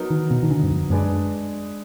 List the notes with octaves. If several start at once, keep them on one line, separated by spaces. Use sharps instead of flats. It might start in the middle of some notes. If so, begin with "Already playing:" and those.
Already playing: F#3 B3 D#4 A#4
D#3
B2
D#3
D3
F#2
F2
F#2 G#3 D4 G#4 B4 D5